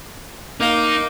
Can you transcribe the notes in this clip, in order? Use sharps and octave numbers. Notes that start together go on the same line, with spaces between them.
A#3 D#4